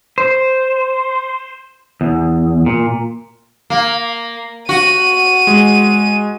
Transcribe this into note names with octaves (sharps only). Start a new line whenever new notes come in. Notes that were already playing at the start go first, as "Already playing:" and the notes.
C5
E2
A#2
A#3
F#4 D#7
G#3